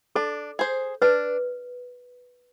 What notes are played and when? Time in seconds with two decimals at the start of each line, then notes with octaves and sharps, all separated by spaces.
0.16 D4 A4
0.59 G#4 C5
1.02 D4 B4